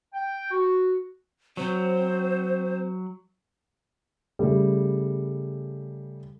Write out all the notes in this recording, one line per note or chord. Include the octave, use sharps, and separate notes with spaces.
G5
F#4
F#3 C4 C5
C#3 G3 A3